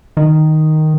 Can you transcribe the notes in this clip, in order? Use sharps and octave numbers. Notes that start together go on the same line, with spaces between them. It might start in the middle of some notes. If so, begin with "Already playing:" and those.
D#3